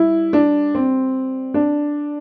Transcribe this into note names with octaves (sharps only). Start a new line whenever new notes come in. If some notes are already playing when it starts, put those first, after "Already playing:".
Already playing: G3 E4
D4
C4
D4